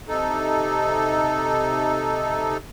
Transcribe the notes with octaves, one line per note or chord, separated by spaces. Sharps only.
C3 D#4 A4